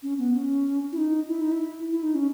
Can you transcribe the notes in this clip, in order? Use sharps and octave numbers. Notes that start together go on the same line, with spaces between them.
C#4
B3
C#4
E4
D#4
E4
D#4
E4
E4
D#4
C#4